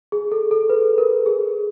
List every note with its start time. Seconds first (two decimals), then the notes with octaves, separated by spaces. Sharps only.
0.12 G#4
0.32 A4
0.51 A4
0.70 B4
0.98 A#4
1.26 G#4